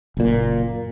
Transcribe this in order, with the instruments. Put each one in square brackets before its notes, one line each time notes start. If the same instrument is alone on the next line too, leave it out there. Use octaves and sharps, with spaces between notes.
[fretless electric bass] F#1 A#2